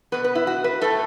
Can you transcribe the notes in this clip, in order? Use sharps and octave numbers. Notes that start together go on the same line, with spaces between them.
B2 B3 B4
B4
E4
F#4
B4
A2 A3 A4